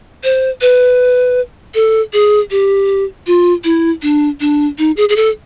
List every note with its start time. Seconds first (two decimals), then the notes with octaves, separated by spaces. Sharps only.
0.24 C5
0.61 B4
1.75 A4
2.13 G#4
2.51 G4
3.27 F4
3.64 E4
4.02 D4
4.40 D4
4.78 D#4
4.97 G#4
5.09 G#4
5.16 A4